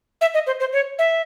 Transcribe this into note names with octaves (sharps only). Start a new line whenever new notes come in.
E5
D#5
C5
C5
C#5
E5